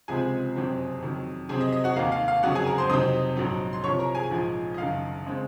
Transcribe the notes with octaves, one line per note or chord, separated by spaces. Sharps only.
C#2 C3 F3 G#3 C4 G#4 G#5
F#1 F2 C3 F#3 C4
F2 D#3 F#3
F2 C3 F#3 C4 G#4 G#5
D#5
D#5
F#4 F#5
F1 D#2 D#3 A#3 F5
F5
F5
F2 C#3 F#3 F#4 F#5
G#4 G#5
A#4 A#5
C5 C6
F2 C3 F#3 C4 D#4 D#5 D#6
A#1 G#2 F#3
C6
C2 C3 F3 C#5 C#6
A#4 A#5
G#4 G#5
A#1 G#2 F3
D#5
F#1 F#2 D#3 F5
C#3 G#3 C4